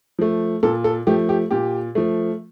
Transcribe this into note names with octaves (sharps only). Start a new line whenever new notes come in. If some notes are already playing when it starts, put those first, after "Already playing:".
F3 A3
A#2 A4
A4
F3 A3 G4
G4
A#2 G4
F3 A3